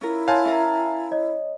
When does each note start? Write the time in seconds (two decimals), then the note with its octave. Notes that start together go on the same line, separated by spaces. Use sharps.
0.01 C#4 E4 F4 A#4
0.28 C#5 F5 G#5 A5 C6
0.45 C#4 A#4 E5 A#5
1.11 C#5 D#5